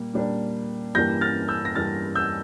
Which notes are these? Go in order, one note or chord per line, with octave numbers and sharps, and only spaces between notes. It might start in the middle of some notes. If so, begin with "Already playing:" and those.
Already playing: A#2 G3 A#3
A#2 G3 A#3 D4
G2 E3 G3 A#3 G6 A#6
F6 A6
E6 G6
A#6
G2 E3 G3 A#3 F6 A6
E6 G6